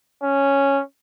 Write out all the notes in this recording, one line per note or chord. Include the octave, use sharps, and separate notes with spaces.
C#4